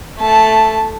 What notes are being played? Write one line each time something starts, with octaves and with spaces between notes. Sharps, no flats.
A3 A5